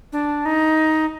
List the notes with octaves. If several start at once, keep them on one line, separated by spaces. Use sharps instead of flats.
D4
D#4